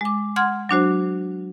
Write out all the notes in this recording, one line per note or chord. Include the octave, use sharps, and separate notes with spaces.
G#3 D6
F#5 C6 F6 G#6
F#3 D4 F#4 C5